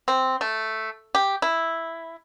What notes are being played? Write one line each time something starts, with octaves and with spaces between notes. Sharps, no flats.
C4
A3
G4
E4